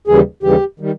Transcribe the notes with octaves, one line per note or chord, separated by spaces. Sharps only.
D#2 C#3 E3 G3 G#4
D#2 C#3 E3 G3 G4
D#3 G3